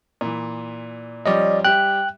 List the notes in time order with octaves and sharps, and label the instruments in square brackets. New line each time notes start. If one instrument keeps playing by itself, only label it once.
[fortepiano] A#2 E3
[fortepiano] F3 G3 C#4 [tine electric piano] D5 D#5
[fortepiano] G3 G4 E5 [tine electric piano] G5 F#6